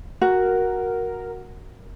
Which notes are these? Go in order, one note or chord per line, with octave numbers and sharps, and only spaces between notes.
F#4 A#4